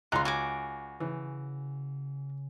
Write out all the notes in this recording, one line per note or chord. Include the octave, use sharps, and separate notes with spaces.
C#2 D#4 A#5 C6 F#6
F#4 G#5 D6
C#3 E3